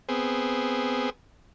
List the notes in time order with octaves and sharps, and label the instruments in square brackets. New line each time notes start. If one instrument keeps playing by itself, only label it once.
[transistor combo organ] B3 C4 G#4